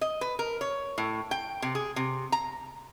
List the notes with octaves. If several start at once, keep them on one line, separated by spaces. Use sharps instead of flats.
D#5
B4
A#4
C#5
A2
G5
C3
G#4
C3
A#5